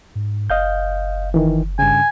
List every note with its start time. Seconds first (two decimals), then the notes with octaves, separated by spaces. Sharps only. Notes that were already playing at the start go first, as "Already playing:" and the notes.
0.15 G#2
0.50 F#1 D#5 F5 G6
1.34 D#3 E3
1.79 G2 C#3 G#5